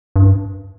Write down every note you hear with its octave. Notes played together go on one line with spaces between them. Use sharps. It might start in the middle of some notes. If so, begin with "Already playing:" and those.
G2